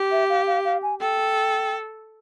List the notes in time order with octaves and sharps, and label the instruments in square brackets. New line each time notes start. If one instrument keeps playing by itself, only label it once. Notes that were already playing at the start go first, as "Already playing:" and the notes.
Already playing: [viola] G4
[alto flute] E5
F5
F5
F5
G#5
[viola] A4 [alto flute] G5